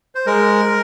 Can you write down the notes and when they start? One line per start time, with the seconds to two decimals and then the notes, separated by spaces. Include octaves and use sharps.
0.15 C5
0.26 G#3 A#4